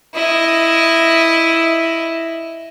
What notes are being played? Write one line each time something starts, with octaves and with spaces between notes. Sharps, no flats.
E4 D#5